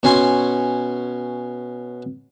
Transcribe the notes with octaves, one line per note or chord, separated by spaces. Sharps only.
B2 C#4 G#5 C6